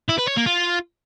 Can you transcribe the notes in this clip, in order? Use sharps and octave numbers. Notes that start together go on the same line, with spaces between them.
E4
B4
C#5
A#3
F4